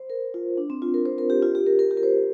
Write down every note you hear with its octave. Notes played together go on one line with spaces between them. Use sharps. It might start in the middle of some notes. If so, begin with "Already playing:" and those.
Already playing: C5
A#4
F4
D4
C4
F4
A#4
C5
A#4
G4
F4
G4
A#4
A#4
G4
A#4
C5